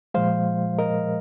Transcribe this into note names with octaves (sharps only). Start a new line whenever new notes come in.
A#2 F3 G#3 C5 F5
A#4 D#5